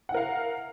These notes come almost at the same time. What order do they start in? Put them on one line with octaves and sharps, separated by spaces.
F#5 E4 A#4 F5